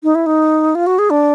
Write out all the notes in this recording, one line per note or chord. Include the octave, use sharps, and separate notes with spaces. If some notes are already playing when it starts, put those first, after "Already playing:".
D#4
E4
D#4
F4
F#4
G#4
D4